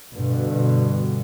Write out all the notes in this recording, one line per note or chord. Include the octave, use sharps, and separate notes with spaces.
G2 B2 D3